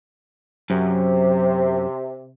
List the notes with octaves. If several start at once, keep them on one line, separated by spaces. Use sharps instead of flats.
F#2 C3